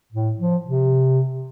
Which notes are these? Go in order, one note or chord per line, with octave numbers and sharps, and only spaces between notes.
A2
F3
C3